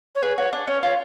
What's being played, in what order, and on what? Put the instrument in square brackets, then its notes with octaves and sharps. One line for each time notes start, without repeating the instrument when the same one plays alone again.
[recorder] C#5
[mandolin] G#4 [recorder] B4
[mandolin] F#4 [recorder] C#5
[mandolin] D4
[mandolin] C#4 [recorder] C#5
[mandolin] F4 [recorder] C#5